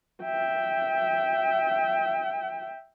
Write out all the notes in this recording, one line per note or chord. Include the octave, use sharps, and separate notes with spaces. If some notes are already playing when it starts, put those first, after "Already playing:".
E5 G5